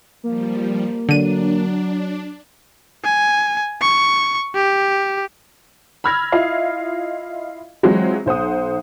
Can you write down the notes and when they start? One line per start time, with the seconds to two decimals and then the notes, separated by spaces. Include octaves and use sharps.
0.24 F3 G3 A#3
1.09 D3 F#3 D4 D#7
3.04 G#5
3.81 C#6
4.55 G4
6.04 B5 E6 F6 G#6 A#6
6.32 E4 F4 D#5 F5
7.83 E3 F#3 G#3 C4 F4 F#4
8.26 B1 C5 F#5 D#6